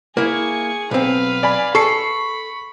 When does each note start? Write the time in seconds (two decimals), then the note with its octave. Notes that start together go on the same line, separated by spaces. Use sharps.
0.17 A#3 E4 G#4 C#6
0.91 B1 C4 B4 F5
1.43 D5 G#5 B5
1.75 A4 B5 C#6 C7 C#7